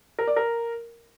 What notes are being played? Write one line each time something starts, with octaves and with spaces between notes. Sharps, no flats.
A#4
D5
A#4